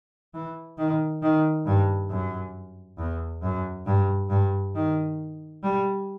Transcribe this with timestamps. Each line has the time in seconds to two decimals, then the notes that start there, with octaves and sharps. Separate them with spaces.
0.34 E3
0.78 D#3
1.22 D#3
1.66 G2
2.10 F#2
2.98 E2
3.43 F#2
3.87 G2
4.30 G2
4.75 D#3
5.63 G3